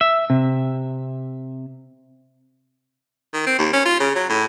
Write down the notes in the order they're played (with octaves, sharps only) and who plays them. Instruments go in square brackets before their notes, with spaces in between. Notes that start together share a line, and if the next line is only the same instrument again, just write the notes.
[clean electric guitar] E5
C3
[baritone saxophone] D#3
C4
D#2
C#4
F4
C#3
F#3
A2